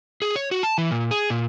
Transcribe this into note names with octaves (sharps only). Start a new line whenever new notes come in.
G#4
C#5
F#4
A5
E3
A#2
G#4
A#2